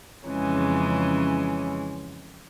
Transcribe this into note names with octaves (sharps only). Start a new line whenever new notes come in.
F2 C#3 E3 G#3 C#4